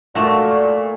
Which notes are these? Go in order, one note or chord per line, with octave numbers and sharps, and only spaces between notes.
A#2 A3 F#4